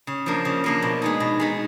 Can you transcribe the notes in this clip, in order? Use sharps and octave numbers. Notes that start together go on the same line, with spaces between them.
C#3
F3 A#3 D4
C#3
F3 A#3 D4
B2
G#3 B3 D#4
B2
G#3 B3 D#4